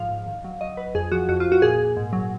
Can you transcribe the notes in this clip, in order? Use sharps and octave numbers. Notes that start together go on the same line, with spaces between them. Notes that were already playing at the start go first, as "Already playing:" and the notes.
Already playing: G#2 F3 F5
G#2
D#3
F#3
F#3 D#5
F#3 B4
F2 G#4
F3 F#4
F2 F#4
F4
F2
F#4
A#2 G#4
A#2
G#2
F#3